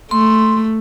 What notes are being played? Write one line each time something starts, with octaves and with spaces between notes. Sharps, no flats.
A3 C6